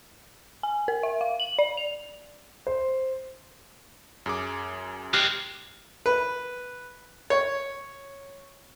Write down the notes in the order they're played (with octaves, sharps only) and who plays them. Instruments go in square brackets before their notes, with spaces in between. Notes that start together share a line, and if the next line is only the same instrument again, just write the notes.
[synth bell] G#5
A#4
E5
F5
F#7
D5
F7
[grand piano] C5
[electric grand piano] F#2 G#4 D6
[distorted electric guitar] G#3 C4 [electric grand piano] G4 F6 F#6
[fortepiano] B4
C#5